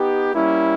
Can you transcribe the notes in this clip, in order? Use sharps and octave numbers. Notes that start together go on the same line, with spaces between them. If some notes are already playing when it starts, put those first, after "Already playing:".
Already playing: B3 D#4 G4
G3 A#3 C#4 E4